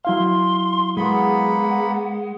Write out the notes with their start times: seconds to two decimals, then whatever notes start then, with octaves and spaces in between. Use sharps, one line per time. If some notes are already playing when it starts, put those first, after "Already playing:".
0.05 F#3 E4 F5 C6
0.97 G#3 A#3 B3 F#5 B5